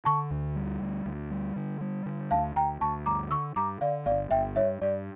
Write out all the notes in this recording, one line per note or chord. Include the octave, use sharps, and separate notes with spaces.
D3 A5 C#6
D2
G3
D2
D2
G3
D3
G3
D3
D2 F5 A5
D2 G5 A#5
D2 A5 C#6
G2 A#5 D6
D3 C#6 E6
G2 A#5 D6
D3 D5 F5
G1 D5 F5
G1 E5 G5
G2 C#5 E5
G2 D5